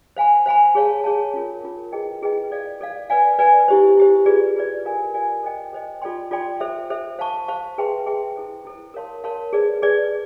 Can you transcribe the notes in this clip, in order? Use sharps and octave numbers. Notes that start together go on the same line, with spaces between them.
C5 F5 G#5 B5
C5 F5 G#5 B5
G#4 C#5 F5 A5
G#4 C#5 F5 A5
C#4 F4 A#4
C#4 F4 A#4
E4 G#4 B4 D#5 G5
E4 G#4 B4 D#5 G5
A4 D5 F5
A4 D5 F5
B4 D5 F5 G#5
B4 D5 F5 G#5
E4 G4 C5
E4 G4 C5
F4 G#4 B4 D5
F4 G#4 B4 D5
F4 A#4 D5 F5 G#5
F4 A#4 D5 F5 G#5
A4 C5 D#5 G5
A4 C5 D#5 G5
F4 A4 D5 G5 C6
F4 A4 D5 G5 C6
A4 C5 E5
A4 C5 E5
C5 F5 A5 C#6
C5 F5 A5 C#6
G#4 B4 E5 G5 C6
G#4 B4 E5 G5 C6
E4 A4 C5
E4 A4 C5
A#4 C#5 F5 A5 C6
A#4 C#5 F5 A5 C6
G#4 B4 D5
G#4 B4 D5